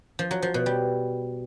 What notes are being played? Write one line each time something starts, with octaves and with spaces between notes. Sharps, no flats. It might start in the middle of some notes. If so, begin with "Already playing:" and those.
F3
F#3
F3
B2
G3